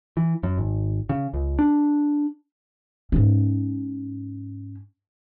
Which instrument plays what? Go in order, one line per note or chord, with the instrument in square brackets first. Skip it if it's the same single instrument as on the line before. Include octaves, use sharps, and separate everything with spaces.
[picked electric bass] E3
F#2
G#1
C#3
C#2
D4
[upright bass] G#2 C#4